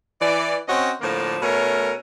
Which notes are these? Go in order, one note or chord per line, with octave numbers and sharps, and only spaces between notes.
E3 D5
C4 C#4 F#4 C#5 D#5
A2 D3 F3 A#3
B2 A3 C#4 A#4